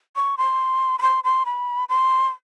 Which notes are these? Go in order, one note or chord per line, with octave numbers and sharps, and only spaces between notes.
C#6
C6
B5
C6
C6
B5
C6